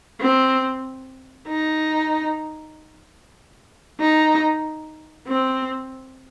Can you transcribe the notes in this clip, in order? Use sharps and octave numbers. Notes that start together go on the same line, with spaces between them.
C4
D#4
D#4
C4